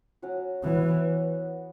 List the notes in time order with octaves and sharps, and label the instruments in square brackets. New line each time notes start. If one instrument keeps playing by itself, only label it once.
[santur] F#3 C#4 F#4
[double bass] E3 [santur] B3 F#4 C#5